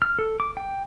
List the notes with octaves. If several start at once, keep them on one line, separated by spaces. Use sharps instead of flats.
F6
A4
D6
G5